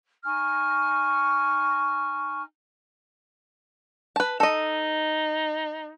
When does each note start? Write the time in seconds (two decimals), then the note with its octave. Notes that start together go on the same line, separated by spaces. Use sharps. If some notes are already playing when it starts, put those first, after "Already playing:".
0.24 D#4 G#5 C#6 F6
4.16 B4 A5
4.40 D#4 A4 D#5